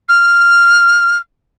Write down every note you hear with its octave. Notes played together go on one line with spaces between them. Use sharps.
F6